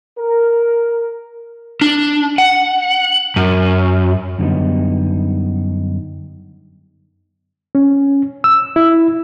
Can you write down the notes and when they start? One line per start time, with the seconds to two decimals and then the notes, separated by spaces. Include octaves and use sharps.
0.19 A#4
1.81 D4
2.38 F#5
3.36 F#2
4.39 F#2 D3 G3 B3 D#4
7.75 C#4
8.44 E6
8.76 E4